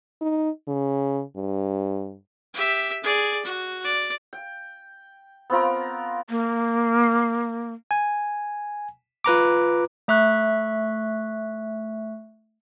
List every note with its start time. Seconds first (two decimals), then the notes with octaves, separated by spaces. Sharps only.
0.21 D#4
0.67 C#3
1.36 G2
2.54 G4 E5
3.03 G#4 D5
3.45 F#4
3.84 D5
4.33 G5
5.50 B3 C4 F4 A#4
6.30 A#3
7.91 G#5
9.24 F4 B4 A#5 D6
10.08 A3 E5 C#6 F#6